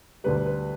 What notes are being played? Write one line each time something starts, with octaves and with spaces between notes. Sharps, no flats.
D2 D3 G3 B4
B4